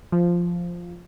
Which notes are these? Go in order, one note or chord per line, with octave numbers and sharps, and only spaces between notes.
F3